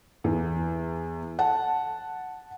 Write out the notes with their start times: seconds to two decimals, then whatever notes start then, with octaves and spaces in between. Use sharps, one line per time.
0.24 E2
1.39 F#5 A5